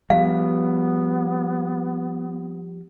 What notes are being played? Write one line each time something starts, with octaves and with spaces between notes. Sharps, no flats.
F3 G3 B3 F5